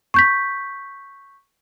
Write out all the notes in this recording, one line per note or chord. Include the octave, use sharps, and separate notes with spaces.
C#6 G6 B6